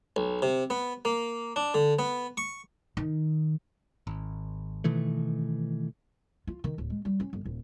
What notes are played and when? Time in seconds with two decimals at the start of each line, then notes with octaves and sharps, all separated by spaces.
0.16 B1
0.42 C3
0.70 B3
1.05 A#3
1.56 D4
1.74 D3
1.99 B3
2.37 C#6
2.97 D#3
4.07 G#1
4.84 B2 D#3 E3 A3
6.47 F4
6.64 D#3
6.78 D1
6.90 G#3
7.05 G3
7.20 C#4
7.33 G1
7.45 D#1